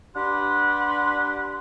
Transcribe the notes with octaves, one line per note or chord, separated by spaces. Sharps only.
D4 G4 B4 F#5 C6